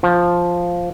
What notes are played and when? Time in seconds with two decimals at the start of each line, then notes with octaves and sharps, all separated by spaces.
0.03 F3